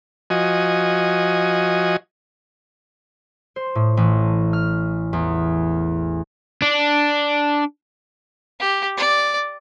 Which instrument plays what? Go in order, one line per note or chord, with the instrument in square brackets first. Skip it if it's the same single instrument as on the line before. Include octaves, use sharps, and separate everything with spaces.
[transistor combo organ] F3 F#4 D#5 G#5
[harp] C5
A2
A1
F6
E2
[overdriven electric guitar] D4
[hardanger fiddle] G4
D5